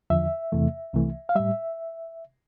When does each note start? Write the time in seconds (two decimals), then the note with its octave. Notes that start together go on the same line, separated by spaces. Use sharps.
0.10 E2 D3 F3 E5
0.52 E2 C3 E3 A3
0.93 C2 C3 E3 A3
1.29 F5
1.35 A2 G3 E5